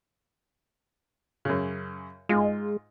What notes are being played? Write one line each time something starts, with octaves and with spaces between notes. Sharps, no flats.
F#2 C#3
G#2 G#3 F4